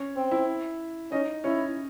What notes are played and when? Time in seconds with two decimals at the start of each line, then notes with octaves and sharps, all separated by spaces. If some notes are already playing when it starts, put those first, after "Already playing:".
Already playing: C#4 C#5
0.16 C4
0.31 E4 E5
1.12 C#4 D#4 D#5
1.44 C#4 E4 C#5